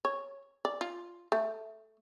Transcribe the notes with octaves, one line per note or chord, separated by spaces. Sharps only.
C#5
D5
F4
A3